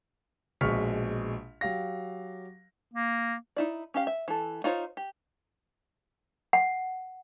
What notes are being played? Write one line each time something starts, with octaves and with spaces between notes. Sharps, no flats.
A#1 B2 G#3 C#6 F6 B6
F#3 G4 F5 A#6
A#3
D#4 E4 D5
C#4 G4 F5
E5
E3 A4
D#4 F4 C5 C#5
G4
F#5